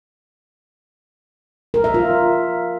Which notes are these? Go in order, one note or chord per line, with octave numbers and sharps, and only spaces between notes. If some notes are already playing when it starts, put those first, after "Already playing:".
A#4
E5
F4